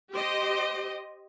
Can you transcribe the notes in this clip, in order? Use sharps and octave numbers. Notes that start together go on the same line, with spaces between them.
G4 C5 D#5